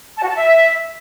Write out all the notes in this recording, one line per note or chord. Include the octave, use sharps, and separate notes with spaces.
A5
F#4
A5
E5